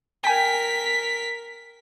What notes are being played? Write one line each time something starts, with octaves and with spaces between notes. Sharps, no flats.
A#4 G5 G#5 B6